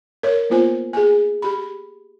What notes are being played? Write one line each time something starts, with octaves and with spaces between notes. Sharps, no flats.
A#4 C#5
A#3 B3 F4 C5 G#5
G#4 G#5
G4 B5